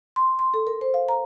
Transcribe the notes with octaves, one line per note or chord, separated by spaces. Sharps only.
C6
C6
A4
A#4
C5
F5
A#5